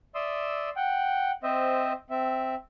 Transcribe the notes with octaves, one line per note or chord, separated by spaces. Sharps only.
D5 E5 C6 D#6 E6
F#5 G5
C4 C5 D#5 E5
C4 E5